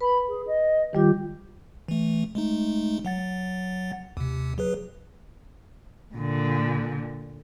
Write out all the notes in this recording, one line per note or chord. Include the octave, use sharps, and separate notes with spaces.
B4 B5
G#4
D#5
D#3 G3 F4 G4
E3 A3
G#3 A3 D#4
F#3 F#5 A6
D#2 C3
F#3 G#4 B4
A#2 D3